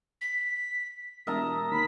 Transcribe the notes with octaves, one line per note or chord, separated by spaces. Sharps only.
B6
E1 A#4 E5 A5 D#6
D#2 B5 B6